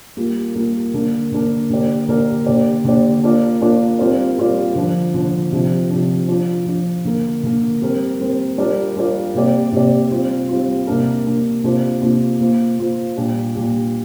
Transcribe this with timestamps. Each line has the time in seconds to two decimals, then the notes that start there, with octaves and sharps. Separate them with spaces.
0.17 G3 A#3 F4 A#4
0.55 G3 A#3 F4 A#4
0.94 D3 A#3 D4 A#4
1.32 D3 A#3 D4 A#4
1.70 D3 A#3 G4 A#4 D5
2.08 D3 A#3 G4 A#4 D5
2.46 D3 A#3 G4 D5
2.84 D3 A#3 G4 D5
3.23 A#3 D4 F4 A#4 D5
3.61 A#3 D4 F4 A#4 D5
3.99 G3 C4 F4 A#4 D5
4.38 G3 C4 F4 A#4 D5
4.75 D3 F3 D4
5.14 D3 F3 D4
5.52 C3 F3 D4
5.90 C3 F3 D4
6.28 F3 D4 F4
6.67 F3 D4 F4
7.05 D3 A#3 D4 A#4
7.43 D3 A#3 D4 A#4
7.82 G3 C4 A#4
8.20 G3 C4 A#4
8.58 G3 D4 F4 A#4 D5
8.96 G3 D4 F4 A#4 D5
9.34 C3 A#3 G4 D5
9.72 C3 A#3 G4 D5
10.11 G3 C4 F4
10.49 G3 C4 F4
10.87 C3 A#3 D4 A#4
11.25 C3 A#3 D4 A#4
11.64 C3 A#3 D4 F4 C5
12.02 C3 A#3 D4 F4 C5
12.40 A#3 F4 C5
12.78 A#3 F4 C5
13.16 A#2 G3 D4 G4
13.55 A#2 G3 D4 G4